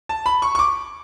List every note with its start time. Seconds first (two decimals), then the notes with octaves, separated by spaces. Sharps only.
0.09 A5
0.26 B5
0.42 C#6
0.55 C#6
0.59 D6